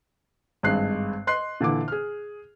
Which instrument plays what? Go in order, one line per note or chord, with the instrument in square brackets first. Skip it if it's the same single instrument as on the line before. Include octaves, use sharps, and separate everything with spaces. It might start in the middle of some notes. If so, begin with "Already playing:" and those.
[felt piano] G#1 G2 G#3 D#5 F#6 C7
D#5 C6 F#6 C7
A#2 D3 E3 D6
G#4 F6